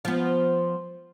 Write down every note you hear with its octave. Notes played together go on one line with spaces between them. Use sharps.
F3 B3